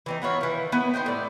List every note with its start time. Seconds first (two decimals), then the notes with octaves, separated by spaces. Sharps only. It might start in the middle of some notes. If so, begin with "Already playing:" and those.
0.06 E3 C4 D#4
0.22 B3 E4 F4 C#5
0.41 D#3 E3
0.72 B3 E4
0.94 D#4 C5 D#5 G5
1.06 A2 D5